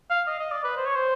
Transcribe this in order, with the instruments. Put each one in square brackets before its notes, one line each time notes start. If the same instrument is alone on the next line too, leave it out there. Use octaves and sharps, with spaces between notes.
[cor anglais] F5
D#5
D#5
D5
B4
C5
C#5
C5